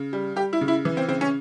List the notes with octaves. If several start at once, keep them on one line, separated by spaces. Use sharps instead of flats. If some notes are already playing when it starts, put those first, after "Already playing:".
Already playing: C#3
G3
G3 G4
E4
C#3
E4
E3
C4
C#3 C4
C#4